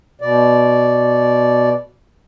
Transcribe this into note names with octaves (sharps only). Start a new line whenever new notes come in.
B2 D5